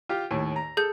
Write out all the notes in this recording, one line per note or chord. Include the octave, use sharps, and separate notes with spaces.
F4 G4
D#2 A2
A#5
G#4 A4 G6